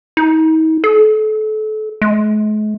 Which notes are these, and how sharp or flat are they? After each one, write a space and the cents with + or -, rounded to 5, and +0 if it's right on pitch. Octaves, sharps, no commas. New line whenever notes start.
D#4 +40
A4 -30
G#3 +45